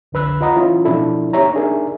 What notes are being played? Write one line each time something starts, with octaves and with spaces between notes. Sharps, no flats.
C2 F2 D3 B4 E6 F#6
F4 B4 D#5 F#5 A#5 D#6
E3 C#4 E4 F4
B2 F3 D4 E4 A4
A#3 D#4 G4 C#5 E5 A#5
D4 D#4 G#4 A#4 E5